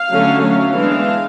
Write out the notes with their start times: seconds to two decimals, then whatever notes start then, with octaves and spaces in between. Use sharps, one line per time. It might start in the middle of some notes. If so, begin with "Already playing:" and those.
Already playing: F5
0.10 D3 F#3 A3 C#4
0.42 F#3 A3 C#4 F5
0.75 E3 G#3 B3 D4